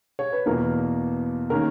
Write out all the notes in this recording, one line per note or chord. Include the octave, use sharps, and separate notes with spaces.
C#5
B4
E2 B2 A#3 A#4
D#3 A#3 C#4 A#4